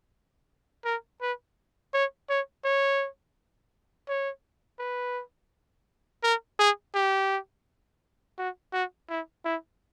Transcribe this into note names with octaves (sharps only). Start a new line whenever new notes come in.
A#4
B4
C#5
C#5
C#5
C#5
B4
A#4
G#4
G4
F#4
F#4
E4
E4